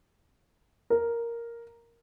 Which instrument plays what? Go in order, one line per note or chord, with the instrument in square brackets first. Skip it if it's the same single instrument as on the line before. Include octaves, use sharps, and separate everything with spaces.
[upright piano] A#4